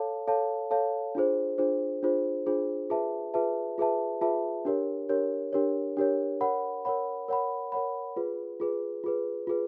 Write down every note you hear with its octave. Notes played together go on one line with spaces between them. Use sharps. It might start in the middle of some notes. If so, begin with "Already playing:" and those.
Already playing: A4 C#5 F5 A5
A4 C#5 F5 A5
A4 C#5 F5 A5
D4 F4 G#4 C5
D4 F4 G#4 C5
D4 F4 G#4 C5
D4 F4 G#4 C5
F4 G#4 B4 E5 A5
F4 G#4 B4 E5 A5
F4 G#4 B4 E5 A5
F4 G#4 B4 E5 A5
D4 G4 A#4 C#5
D4 G4 A#4 C#5
D4 G4 A#4 C#5
D4 G4 A#4 C#5
A#4 C#5 F#5 B5
A#4 C#5 F#5 B5
A#4 C#5 F#5 B5
A#4 C#5 F#5 B5
F4 G#4 B4
F4 G#4 B4
F4 G#4 B4
F4 G#4 B4